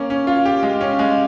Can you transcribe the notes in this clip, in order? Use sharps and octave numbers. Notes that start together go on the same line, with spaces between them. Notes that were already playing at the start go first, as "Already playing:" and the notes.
Already playing: A#3 C#4
C#4
F4
G4
G#3
C#4
G#3